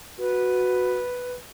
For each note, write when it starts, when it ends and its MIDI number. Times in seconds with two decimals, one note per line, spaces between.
0.19 1.01 66
0.19 1.34 71